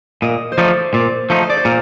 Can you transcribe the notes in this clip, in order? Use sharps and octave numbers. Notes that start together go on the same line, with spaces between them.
A#2 D#5
C5
F3 A3 D#4 D5
A#2 D5
F3 A3 D#4
C5
D5
C5
A#2 A#4